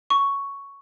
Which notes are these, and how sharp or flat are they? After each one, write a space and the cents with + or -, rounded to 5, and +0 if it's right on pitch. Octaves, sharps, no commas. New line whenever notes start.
C#6 +5